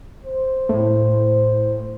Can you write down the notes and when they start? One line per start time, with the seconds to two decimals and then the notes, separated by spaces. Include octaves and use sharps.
0.23 C5
0.69 A2